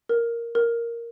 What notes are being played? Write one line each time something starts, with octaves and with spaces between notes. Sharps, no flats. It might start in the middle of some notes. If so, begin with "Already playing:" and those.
A#4
A#4